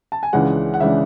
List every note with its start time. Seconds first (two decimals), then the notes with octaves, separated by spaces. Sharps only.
0.12 A5
0.23 G#5
0.33 C#2 C#3 E3 G#3 D4 F#5
0.74 F#5
0.80 C#3 E3 G#3 D4 E5